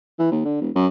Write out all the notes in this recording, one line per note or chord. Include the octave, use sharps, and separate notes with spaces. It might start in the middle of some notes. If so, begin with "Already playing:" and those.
E3
D#2
D3
E1
F#2